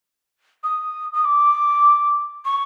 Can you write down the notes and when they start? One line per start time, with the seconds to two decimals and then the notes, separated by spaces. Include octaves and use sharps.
0.63 D#6
1.13 D#6
1.24 D6
2.45 C#6